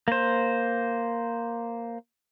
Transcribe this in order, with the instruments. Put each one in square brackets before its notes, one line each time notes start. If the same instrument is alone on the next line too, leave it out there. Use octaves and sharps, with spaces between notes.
[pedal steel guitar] A#3 C5